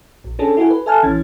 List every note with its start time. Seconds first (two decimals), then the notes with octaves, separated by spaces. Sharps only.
0.24 A#1
0.39 C#4 D4 G#4 A4
0.57 E4 F#4 G4 A4 G#5
0.70 B4
0.86 A4 E5 G#5 A5 F6 F#6
1.03 A#1 E3 C#4 F6 G#6 A6